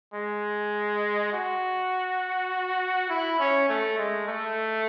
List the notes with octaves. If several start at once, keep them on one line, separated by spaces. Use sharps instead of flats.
G#3
F#4
E4
C#4
A3
G#3
A3